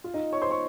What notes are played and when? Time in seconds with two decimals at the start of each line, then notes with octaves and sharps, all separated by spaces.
0.04 F4
0.14 D#4 D#5
0.32 C#5 C#6
0.42 C5 C6
0.51 C#5 C#6